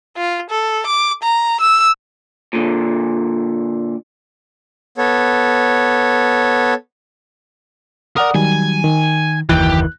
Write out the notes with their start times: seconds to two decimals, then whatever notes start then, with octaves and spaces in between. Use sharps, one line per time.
0.17 F4
0.50 A4
0.87 D6
1.23 A#5
1.61 E6
2.53 A#2 D3
4.98 B3 A4 C#5
8.16 A#4 D5 F#5 D#6
8.35 D#3 F#3 G3 G#5
8.84 D#3
9.49 F#1 D#2 E3 G4 F#6